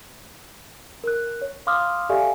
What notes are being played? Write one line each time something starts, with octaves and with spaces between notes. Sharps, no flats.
A#4 F#6
C#5
F5 C6 D6 D#6 F6
G4 A4 D5 E5 F5 G#5